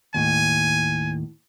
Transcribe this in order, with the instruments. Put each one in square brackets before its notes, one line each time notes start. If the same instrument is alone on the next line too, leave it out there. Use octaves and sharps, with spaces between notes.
[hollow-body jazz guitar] D#2 A2 [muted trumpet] G#5